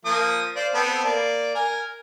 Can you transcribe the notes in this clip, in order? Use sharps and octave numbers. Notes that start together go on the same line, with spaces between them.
F3 A#3 D#6
C5 D5 F5
B3 C4 A4
A#3 D5
A#4 G#5